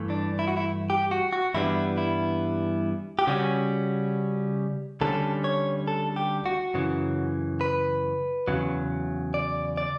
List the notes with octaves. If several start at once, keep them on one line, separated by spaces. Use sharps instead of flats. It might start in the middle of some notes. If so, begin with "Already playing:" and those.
Already playing: G2 E3 A3
D4
E4
F#4
E4
G4
F#4
F#4
G2 E3 G3 B3 D4 E4
E4
G4
C#3 G3 C#4 F#4
D2 D3 G3 C#4 A4
C#5
A4
G4
F#4
F#2 C#3 E3
B4
E2 C#3 F#3
D5
D5